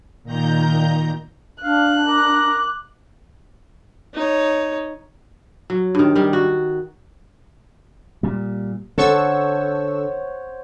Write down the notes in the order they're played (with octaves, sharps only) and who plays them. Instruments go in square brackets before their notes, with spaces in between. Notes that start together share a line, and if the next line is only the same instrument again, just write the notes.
[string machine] A#2 D#3 A#5 G6
[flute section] D4 [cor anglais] F5 [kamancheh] F#6
[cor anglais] A#4 [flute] D6
[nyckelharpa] D#4 C#5
[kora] F#3
G2 D#3
D#3 G3
F#4
[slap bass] A#2 G3
[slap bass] D3 [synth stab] A4 C#6 E6 [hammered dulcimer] C5 C#5 F#5